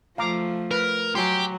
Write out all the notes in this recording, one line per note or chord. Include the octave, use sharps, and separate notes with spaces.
F3 A3 F5 A#5 D6
A#4 B4
F#3 G4 G#5 C6